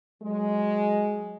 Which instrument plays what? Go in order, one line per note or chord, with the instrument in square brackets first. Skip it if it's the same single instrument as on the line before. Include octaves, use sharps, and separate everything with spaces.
[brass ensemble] F#3 G#3